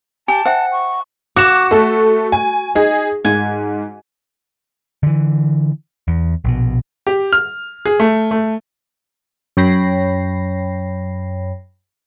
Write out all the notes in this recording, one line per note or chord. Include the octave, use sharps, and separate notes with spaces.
G4 G#5 A5
C5 E5 F#5 G5
C#6
F#4 D6 E7
A3 A4
G#5
D#4 G#4
G#2 G#5
D3 E3
E2
A#1 B2
G4
F6
G#4
A3
A3
F#2 C#5 G5 B5 A#6 C7